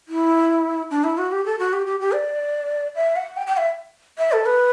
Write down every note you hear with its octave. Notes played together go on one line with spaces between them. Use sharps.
E4
D4
E4
F#4
G4
A4
F#4
G4
G4
G4
D5
E5
F#5
G5
G5
E5
E5
A4
B4